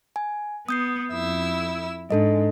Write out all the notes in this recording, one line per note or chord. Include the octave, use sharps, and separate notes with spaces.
G#5
B3 D#6 G6 C7
F2 E4 E6
G#2 D4 A4 D#5